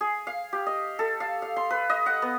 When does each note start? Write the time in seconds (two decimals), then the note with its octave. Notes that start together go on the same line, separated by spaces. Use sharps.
0.01 G#4
0.27 F5
0.53 G4
0.66 D#5
0.99 A4
1.20 F5
1.42 F5
1.56 C6
1.70 B4
1.90 D#5
2.06 F#5
2.22 B3